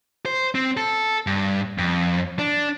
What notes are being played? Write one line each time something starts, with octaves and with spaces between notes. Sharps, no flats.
C5
C4
A4
G2
F2
D4